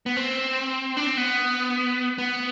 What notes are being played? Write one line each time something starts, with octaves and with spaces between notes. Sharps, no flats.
B3
C4
D4
C4
B3
B3